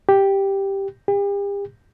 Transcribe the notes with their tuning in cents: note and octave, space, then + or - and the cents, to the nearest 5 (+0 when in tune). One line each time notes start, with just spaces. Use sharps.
G4 +0
G4 +40